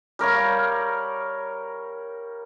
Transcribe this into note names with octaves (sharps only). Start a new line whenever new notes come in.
G3 A#4 C#5 F5